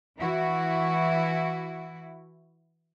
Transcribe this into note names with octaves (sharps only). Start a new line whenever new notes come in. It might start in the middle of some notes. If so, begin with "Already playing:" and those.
E3 E4 F#4